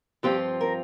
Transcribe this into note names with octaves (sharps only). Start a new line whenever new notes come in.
G2 F3 C4 F4 G4
A#4